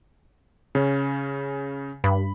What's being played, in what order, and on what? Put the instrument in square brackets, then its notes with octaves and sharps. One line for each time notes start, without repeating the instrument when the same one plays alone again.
[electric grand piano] C#3 C#4
[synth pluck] G2 [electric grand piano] B5